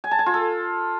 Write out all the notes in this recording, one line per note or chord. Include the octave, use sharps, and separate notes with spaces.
G#5
A5
G#5
F4
A4